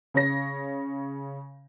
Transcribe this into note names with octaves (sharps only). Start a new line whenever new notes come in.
C#3 C#5 A#6